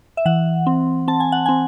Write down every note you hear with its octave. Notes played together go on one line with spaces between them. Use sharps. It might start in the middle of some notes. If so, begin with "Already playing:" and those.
E5
E3 F#5
C4
C4 A5
G#5
F#5
C4 G#5